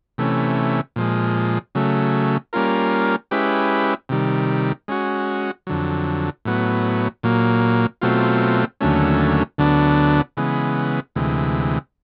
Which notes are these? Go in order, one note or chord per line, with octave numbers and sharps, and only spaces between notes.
C3 E3 A3 C#4
A#2 F3 G#3
C#3 F#3 A3
G3 A#3 C#4 F4 A#4
G#3 C#4 E4 G4 B4
C3 D#3 G3
G#3 C#4 F#4
F2 D3 F#3
A2 F#3 B3
A#2 F#3 A#3
B2 F#3 A3 C4 F4
D#2 D3 F#3 A3 C#4
D2 D3 F#3 B3 D4
C#3 E3 G#3 B3
D2 C3 E3 G#3